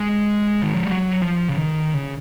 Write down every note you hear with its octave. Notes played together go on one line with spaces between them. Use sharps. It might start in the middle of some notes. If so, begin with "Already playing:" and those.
Already playing: G#3
D#3
F3
F#3
F3
C#3
D#3
C#3